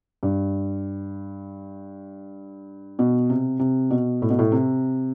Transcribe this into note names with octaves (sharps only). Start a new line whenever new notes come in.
G2
B2
C3
C3
B2
A2
B2
A2
C3